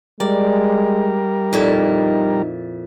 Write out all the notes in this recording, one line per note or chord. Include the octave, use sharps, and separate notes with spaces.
G3 G#3 A#4 D5
F2 A#2 D#4 E4